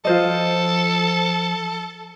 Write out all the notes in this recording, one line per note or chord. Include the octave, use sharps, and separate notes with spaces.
F3 F4 A4 C5 D#5